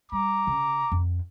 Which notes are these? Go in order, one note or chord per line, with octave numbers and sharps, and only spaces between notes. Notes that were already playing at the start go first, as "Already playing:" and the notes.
G3 A#5 D6
C#3
F2